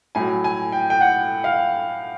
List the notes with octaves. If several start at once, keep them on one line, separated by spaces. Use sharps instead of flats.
A2 F#3 G#5
G#5
G5
G5
F#5
F5